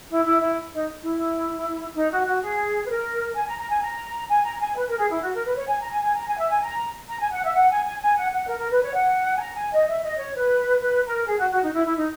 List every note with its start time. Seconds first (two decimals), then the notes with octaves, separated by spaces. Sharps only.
0.09 E4
0.24 E4
0.40 E4
0.72 D#4
1.03 E4
1.95 D#4
2.11 F#4
2.26 F#4
2.42 G#4
2.85 B4
2.89 A#4
3.35 G#5
3.47 A#5
3.58 A#5
3.70 G#5
3.82 A#5
4.29 G#5
4.44 A#5
4.60 G#5
4.75 B4
4.87 A#4
4.98 G#4
5.10 E4
5.22 F#4
5.34 A#4
5.45 B4
5.56 C#5
5.68 G#5
5.80 A#5
5.91 G#5
6.04 G#5
6.14 A#5
6.27 G#5
6.38 E5
6.49 G#5
6.61 A#5
7.08 A#5
7.19 G#5
7.31 F#5
7.43 E5
7.54 F#5
7.70 G#5
7.85 G#5
8.01 G#5
8.16 F#5
8.31 F#5
8.47 A#4
8.59 A#4
8.70 B4
8.82 C#5
8.93 F#5
9.35 G#5
9.41 A#5
9.56 G#5
9.72 D#5
9.87 E5
10.02 D#5
10.18 C#5
10.34 B4
10.80 B4
11.04 A#4
11.27 G#4
11.38 F#4
11.51 F#4
11.62 D#4
11.73 E4
11.85 E4
11.97 D#4